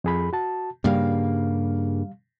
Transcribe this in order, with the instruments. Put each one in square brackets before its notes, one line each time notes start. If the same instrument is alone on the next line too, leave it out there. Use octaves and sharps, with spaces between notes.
[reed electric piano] F2 G#4 B5
F#4 A5
[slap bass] G2 C#3 A#3 [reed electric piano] G3 F5